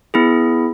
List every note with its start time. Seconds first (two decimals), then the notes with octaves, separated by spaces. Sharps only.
0.14 B3 E4 G#4